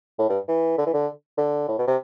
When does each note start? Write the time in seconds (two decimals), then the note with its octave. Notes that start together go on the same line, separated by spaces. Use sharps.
0.19 A2
0.30 G2
0.49 E3
0.78 D3
0.86 E3
0.94 D3
1.38 D3
1.68 A2
1.79 B2
1.88 C3